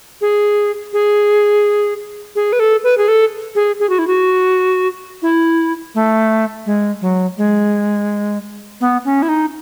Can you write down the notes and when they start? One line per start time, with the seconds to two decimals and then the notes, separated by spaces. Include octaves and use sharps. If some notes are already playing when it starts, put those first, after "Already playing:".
0.21 G#4
0.93 G#4
2.36 G#4
2.53 B4
2.60 A4
2.84 B4
2.98 G#4
3.08 A4
3.55 G#4
3.80 G#4
3.89 F#4
3.99 E4
4.07 F#4
5.22 E4
5.95 A3
6.66 G#3
7.01 F#3
7.38 G#3
8.81 B3
9.05 C#4
9.22 E4
9.29 D#4